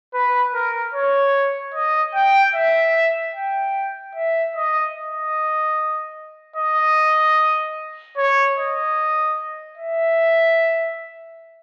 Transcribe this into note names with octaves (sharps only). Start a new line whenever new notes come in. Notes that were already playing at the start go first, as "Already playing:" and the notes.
B4
A#4
C#5
D#5
G5
E5
G5
E5
D#5
D#5
D#5
C#5
D#5
E5